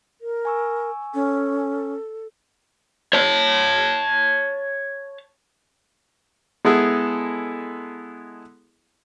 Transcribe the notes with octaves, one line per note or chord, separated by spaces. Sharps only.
A#4
G#5 C#6 E6
C#4 A4
C#5 A5
G#3 B3 E4 G#4 A4